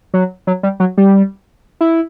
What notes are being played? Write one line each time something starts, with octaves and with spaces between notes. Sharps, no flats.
F#3
F#3
G3
F#3
G3
E4